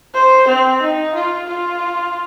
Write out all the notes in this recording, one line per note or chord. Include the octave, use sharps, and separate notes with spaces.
C5
C4
D#4
F4
F4